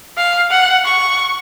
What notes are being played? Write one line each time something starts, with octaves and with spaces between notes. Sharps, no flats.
F5
F#5
C#6